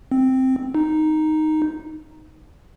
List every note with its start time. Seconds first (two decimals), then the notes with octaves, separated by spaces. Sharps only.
0.12 C4
0.75 D#4